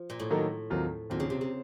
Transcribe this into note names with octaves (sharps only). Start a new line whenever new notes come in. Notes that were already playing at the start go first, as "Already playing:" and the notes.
Already playing: F3
A#2
A2
D#3 F#3 A#3 D#4 A4
D#2 D#3 F#3 C4 F4
D#2 A#2 D#3 F#3 C4 F4
C#3
C3
C#3